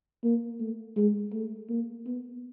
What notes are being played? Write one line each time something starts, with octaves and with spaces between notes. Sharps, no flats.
A#3
A3
G#3
A3
A#3
B3